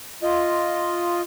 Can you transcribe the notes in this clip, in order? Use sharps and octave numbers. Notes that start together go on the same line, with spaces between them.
F4 D#5